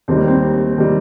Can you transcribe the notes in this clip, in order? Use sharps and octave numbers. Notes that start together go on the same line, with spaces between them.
D#2 D#3 G3 C4
A#3
C4
D#3 G3